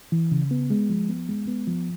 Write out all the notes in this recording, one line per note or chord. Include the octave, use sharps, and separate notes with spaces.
E3
C#3
B3
G#3
F3
B3
G#3
B3
F3